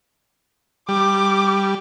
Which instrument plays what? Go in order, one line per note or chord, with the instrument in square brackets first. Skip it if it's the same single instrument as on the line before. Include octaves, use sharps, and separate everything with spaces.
[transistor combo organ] G3 [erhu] D6